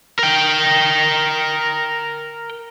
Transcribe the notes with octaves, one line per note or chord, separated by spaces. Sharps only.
A#4 G5